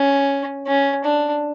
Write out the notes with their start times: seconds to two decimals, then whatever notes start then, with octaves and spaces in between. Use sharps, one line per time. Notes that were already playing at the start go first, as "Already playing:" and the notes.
Already playing: C#4
0.67 C#4
1.05 D4